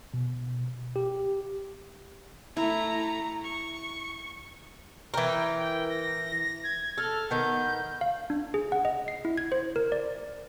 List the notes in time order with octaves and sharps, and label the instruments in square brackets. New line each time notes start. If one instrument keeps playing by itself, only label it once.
[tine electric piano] B2
G4
[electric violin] A3 A#5 [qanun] E4
[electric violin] C#6
[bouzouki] E3 A#4 [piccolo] G5
[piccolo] G5
A#6
G#6
[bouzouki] A4 [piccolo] F6
[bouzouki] D#3 B3 [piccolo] G6
[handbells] F5
D4
G#4
F#5
D#5
C7
E4
G#6
C5
A#4
D5